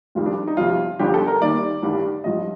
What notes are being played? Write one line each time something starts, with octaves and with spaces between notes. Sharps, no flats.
F1 F2 D#3 G3 F4
D4
D#4
G1 F2 C3 F4
G1 F2 D3 F3 G4
A4
A#4
D#2 D#3 G3 D5
A1 G2 D#3 G3
A1 G2 F3 D#5